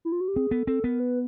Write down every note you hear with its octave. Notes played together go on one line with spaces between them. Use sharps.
E4
F4
F#4
G4
C4 G#4
B3 A4
C4 A4
B3 A#4
B4